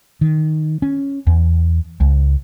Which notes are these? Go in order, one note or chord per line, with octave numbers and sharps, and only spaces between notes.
D#3
C#4
E2
C#2